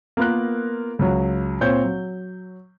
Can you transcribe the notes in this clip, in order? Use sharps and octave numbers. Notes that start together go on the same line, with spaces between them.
A#3 B3 F4 A#4 F#6
C#2 F#3
A#2 C4 C#5 G6
F#3